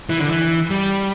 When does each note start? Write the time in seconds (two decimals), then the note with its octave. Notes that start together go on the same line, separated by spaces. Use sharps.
0.09 E3
0.19 D3
0.28 E3
0.70 G3